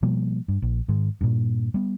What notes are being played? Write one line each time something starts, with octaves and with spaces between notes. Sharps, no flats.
B2 F3 G3 A#3
G2
A#1
G#2 D#3 G#3
G2 A#2
G3 B3